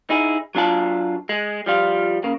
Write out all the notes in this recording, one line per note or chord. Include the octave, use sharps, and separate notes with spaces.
D#4 E4 G#4
F#3 D4 F4 A5
G#3
F3 G3 F4
C#3 A#3